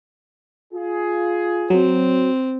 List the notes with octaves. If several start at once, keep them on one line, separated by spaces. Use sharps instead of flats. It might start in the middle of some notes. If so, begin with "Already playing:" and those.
F4 G#4
F#3 C4